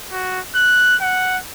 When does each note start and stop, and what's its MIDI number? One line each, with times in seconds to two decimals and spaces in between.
0.12 0.40 66
0.55 0.96 90
1.01 1.38 78